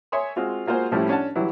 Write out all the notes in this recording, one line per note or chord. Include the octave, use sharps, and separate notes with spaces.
C#5 E5 G#5 C6 D#6
G#3 C4 F4 F#4
G#3 A#3 F4 F#4 C5 G#5
A2 F3 G3 A3 C#4 E4
C#4 D4 F#5 A5
E3 F#3 G3 E4